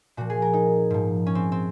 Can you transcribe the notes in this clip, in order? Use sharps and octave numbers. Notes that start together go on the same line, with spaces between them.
A#2 F3 F#4
G#4
A#4
D#4
G#2 F3
C#4
C4
C4